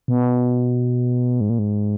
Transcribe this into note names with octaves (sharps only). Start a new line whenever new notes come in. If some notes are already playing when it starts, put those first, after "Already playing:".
B2
G#2
A#2
G#2